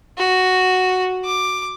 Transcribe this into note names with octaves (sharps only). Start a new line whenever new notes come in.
F#4
D6